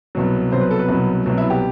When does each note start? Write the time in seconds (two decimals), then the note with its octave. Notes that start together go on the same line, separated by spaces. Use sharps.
0.15 C2 B2 F#3
0.52 C2 B2 F#3 C5
0.61 B4
0.71 A4
0.79 B4
0.88 C2 B2 F#3
1.26 C2 B2 F#3
1.38 E4
1.50 G4